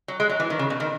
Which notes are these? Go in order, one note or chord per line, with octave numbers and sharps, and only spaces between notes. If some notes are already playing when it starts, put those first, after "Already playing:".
F#3
G#3
F#3
E3
D#3
C#3
B2
D#3